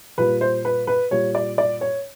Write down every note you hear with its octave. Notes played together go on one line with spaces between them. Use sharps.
A#2 G3 B4
C5
B4
B4
A#2 G3 C#5
D5
D5
C#5